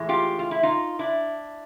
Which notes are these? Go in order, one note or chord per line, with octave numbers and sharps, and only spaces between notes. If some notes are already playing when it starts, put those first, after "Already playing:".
Already playing: A2 E3 G#3
F4 G4
F4
E4
D#4 F4
D4 E4